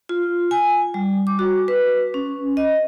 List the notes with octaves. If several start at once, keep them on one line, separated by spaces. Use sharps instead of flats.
F4
G#5
G3
D6
F#4
B4
C#4
D#5